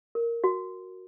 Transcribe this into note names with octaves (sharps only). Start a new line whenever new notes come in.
A#4
F#4